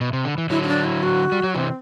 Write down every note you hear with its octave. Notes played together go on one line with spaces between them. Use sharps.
B2
C3
D3
E3
D3 F#3 E4
E4
D4
E4
F#4
G3
F#3
C3 E3 C4